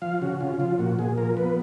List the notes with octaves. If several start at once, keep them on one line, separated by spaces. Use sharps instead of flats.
F3 F5
C#3 F#4
C#3 F4
F3 F4
A#2 F#4
A#2 G#4
F3 A#4
B3 B4